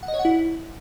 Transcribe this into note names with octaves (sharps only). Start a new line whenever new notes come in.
F#5
D#5
C#5
F#5
E4